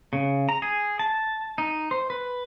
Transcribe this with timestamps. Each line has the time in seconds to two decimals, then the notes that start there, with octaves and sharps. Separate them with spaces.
0.13 C#3
0.49 A#5
0.62 G#4
0.99 A5
1.58 D#4
1.91 C5
2.10 B4